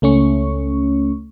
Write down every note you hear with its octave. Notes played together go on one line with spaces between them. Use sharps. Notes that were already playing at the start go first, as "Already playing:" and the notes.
C#2 A3 C#4 C#6